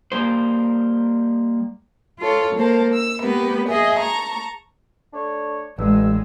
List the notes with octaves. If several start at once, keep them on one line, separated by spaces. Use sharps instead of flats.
G3 A#3 C5
F4 A4 C#5
A#3 C5 A5
E6
A#3 B3 G4 A#4 B4
G#4 D#5 E5 G#5
A5 A#5 C#6
A3 D4 C#5
A1 G2 G#3 E6